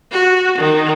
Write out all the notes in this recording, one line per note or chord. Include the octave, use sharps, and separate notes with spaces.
F#4
D#3